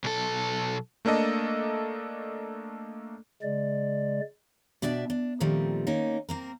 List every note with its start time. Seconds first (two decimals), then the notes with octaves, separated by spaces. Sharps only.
0.04 B1 A4
1.05 A3 A#3 D4 A4 D#5
3.42 C#3 G#3 D5
4.82 B2 D4 D5 E5 G5 A5
5.10 D4
5.40 A#2 D#3 F3 G3 A3 C4
5.87 D#3 A#3 C#4 D#4
6.29 A#3 C4 A#4